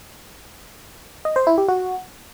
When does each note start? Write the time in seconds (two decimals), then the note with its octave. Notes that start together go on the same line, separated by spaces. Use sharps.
1.25 D#5
1.36 C5
1.47 E4
1.58 G4
1.69 F#4